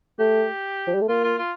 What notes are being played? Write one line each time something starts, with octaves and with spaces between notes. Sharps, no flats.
A3 G4
F3
G3
A3
A#3 F4
F4
F4